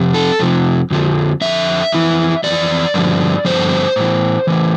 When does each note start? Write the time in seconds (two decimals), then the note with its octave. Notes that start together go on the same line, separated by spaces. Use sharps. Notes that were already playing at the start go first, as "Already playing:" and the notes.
Already playing: F2 C3 F3
0.14 A4
0.39 F2 C3 F3
0.91 F2 D3 F3
1.41 F2 D3 F3 E5
1.92 F2 E3
2.44 F2 E3 D5
2.94 G2 D3 F3
3.45 G2 D3 F3 C5
3.96 A2 E3
4.47 A2 E3